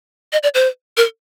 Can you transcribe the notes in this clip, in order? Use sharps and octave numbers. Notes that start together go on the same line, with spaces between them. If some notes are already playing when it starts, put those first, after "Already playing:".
D#5
D5
C5
A#4